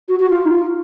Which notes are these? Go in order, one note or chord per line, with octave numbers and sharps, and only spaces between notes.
F#4
F#4
F4
D#4
F4